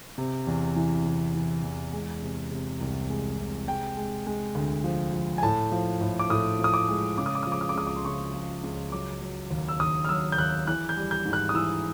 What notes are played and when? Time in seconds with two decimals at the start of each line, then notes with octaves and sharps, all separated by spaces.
0.18 C3
0.47 E2
0.76 E3
1.05 C3
1.35 E3
1.64 E2
1.93 G#3
2.22 C3
2.51 C3
2.81 C2
3.10 G#3
3.38 C3
3.67 G#3 G5
3.97 G#3
4.27 G#3
4.55 D2
4.84 F3
5.13 F3
5.38 G#5
5.43 A2 A5
5.72 F3
6.01 A2
6.19 D6
6.30 A2 D#6
6.59 F3
6.64 D#6
6.74 D6
6.88 G#3
7.18 C#3 D6
7.26 D#6
7.35 D6
7.43 F3 D#6
7.52 D6
7.61 D#6
7.69 D6
7.76 C#2 D#6
7.87 D6
7.96 C6
8.05 C#3 C#6
8.34 F3
8.64 C#2
8.92 F#3 D6
9.22 F#3
9.51 D#2
9.68 E6
9.80 D#2 D#6
10.05 F6
10.09 F#3 E6
10.32 G6
10.38 D#2 F#6
10.67 E3 F#6
10.89 G6
10.97 G3
11.11 G6
11.25 G#2
11.33 F#6
11.49 D#6
11.54 E3 E6